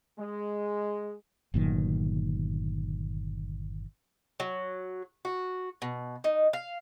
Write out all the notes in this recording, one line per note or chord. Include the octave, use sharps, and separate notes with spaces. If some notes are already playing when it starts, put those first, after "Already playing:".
G#3
G1 A#2 D#3 F#3
F#3
F#4
B2
D#4
F5